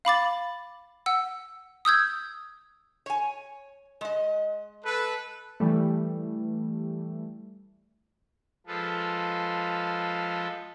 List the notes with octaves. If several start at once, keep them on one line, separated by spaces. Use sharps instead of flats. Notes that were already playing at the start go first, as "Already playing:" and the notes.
F5 B5 D6 A6
F#5 E6
D#6 E6 G6 G#6
C#5 G#5
G#3 D#5
A4 B4
E3 G3 A3
F3 G#3 F4 A4 B4